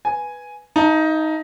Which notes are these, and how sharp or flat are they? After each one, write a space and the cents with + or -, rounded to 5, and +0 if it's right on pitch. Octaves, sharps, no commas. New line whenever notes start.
B4 +0 G#5 +0
D#4 +15 F5 -35 A5 +30